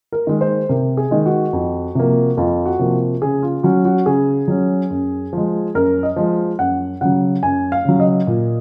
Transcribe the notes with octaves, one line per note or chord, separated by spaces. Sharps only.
A#4
D#3 G#3
C5
C3 A#4
G#4
D#3 G#3
F#4
F2
C3 F3 A#3
F2 F4
F#4
C3 F3 A#3
C#3 G#4
F4
F#3 C#4 F#4
F#4
C#3 G#4
F#3 C#4
F#2
F3 G#3
F#2 A#4
D#5
F3 G#3
F#2 F#5
C#3 F#3 F#5
F#2 G#5
F5
C#3 F#3
D#5
A#2